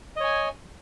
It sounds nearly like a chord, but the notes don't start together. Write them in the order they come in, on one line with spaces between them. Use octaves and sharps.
D#5 C#5 G#5